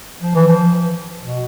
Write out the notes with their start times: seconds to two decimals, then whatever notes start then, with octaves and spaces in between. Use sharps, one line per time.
0.22 F3
0.35 E3
0.48 F3
1.22 B2